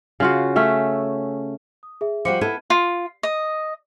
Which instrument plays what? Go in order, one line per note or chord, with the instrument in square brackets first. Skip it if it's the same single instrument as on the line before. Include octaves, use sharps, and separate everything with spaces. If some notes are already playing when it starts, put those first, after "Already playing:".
[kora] C#3 F4 F#4
A3 C#4 E5
[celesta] D#6
G#4 E5
[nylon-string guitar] F3 G3 F#4 [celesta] F5 D6 C#7
[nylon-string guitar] B3 E4 A4 [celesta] F6 G#6 D#7
[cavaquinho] F4
D#5